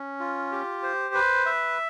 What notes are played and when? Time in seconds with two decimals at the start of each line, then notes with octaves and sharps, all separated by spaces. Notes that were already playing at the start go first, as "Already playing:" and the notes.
Already playing: C#4
0.20 F4
0.52 G4
0.83 C5
1.14 B4
1.46 E5